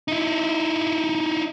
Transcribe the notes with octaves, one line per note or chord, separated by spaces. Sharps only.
D#4 E4